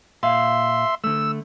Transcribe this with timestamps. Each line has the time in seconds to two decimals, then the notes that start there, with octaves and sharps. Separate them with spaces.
0.23 A#2 E5 F5 C6
1.04 D3 A3 E6